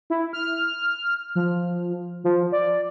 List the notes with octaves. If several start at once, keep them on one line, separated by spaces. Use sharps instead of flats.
E4
F6
F3
F3
D5